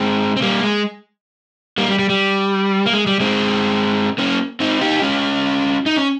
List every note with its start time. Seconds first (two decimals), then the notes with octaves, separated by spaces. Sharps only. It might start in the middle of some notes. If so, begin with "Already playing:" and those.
Already playing: G#3 C4
0.36 C4
0.42 G3 A#3
0.63 G#3
1.78 G3 A#3
1.88 G3
1.99 G3
2.10 G3
2.86 A#3
2.93 G#3
3.07 G3
3.20 G#3 C4
4.18 A#3 C#4
4.60 C4 D#4
4.81 D#4 G4
5.02 C#4 F4
5.86 D#4
5.97 C#4